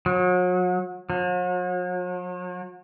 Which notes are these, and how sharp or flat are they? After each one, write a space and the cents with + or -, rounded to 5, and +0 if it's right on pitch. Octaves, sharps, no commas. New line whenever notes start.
F#3 -35
F#3 -45